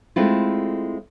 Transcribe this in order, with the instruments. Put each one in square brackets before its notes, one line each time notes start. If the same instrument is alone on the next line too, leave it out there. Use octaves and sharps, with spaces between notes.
[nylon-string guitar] G#3 A3 C4 E4 F4